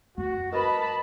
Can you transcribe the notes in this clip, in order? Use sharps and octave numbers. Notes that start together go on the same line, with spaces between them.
F#2 F#4
A#4 B4 D#5 A5 B5